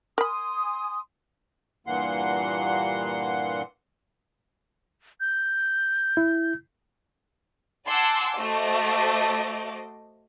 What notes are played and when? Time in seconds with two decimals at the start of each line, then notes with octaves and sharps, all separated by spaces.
0.18 A#4 G#5 B5 C6 D#6
1.87 G2 A#2 E3 A#3 F#5 C6
5.20 G6
6.17 E4
7.87 F#5 G#5 A5 C6 D6 E6
8.37 A3 F#4 C5 D#5 D6